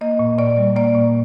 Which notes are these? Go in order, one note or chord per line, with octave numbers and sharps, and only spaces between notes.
A#3 D#5
A#2
A#2 D5
G3
A#3 D5
A#2